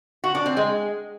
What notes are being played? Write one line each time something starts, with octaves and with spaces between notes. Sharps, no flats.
F#4
D4
C4
G#3